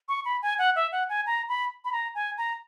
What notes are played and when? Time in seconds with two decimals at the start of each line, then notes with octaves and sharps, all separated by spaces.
0.08 C#6
0.25 B5
0.42 G#5
0.59 F#5
0.76 E5
0.92 F#5
1.09 G#5
1.26 A#5
1.49 B5
1.85 B5
1.92 A#5
2.15 G#5
2.38 A#5